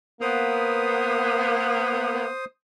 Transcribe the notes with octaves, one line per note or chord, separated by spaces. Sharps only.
A#3 B3 C5 D#6